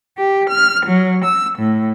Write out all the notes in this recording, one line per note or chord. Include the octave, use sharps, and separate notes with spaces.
G4
F6
F#3
E6
A2